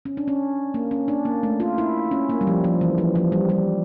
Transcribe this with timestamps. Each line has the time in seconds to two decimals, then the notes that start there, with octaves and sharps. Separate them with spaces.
0.05 C#4
0.17 D4
0.28 C#4
0.74 A#3
0.91 C#4
1.08 D4
1.25 A#3
1.43 A3
1.60 F4
1.78 E4
2.11 C#4
2.30 A#3
2.41 G3
2.47 F3
2.64 F3
2.81 E3
2.98 F3
3.16 F3
3.32 G3
3.49 G3